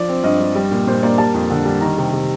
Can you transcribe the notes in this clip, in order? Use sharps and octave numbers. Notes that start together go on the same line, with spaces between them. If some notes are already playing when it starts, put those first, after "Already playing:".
Already playing: F3 D5
C4
G2 D#5
G2
G3
A#2
A#2 C5
A#3 D5
G3 A5
F2
D3
G3
D#3 A#5
C3
C3